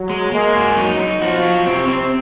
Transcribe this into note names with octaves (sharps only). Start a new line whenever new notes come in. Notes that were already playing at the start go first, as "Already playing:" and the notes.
Already playing: F#3
G#3
G#3 A#3
F#4
F#3 D#4
D#4
F3 F#4
C#5
C3 C4
C4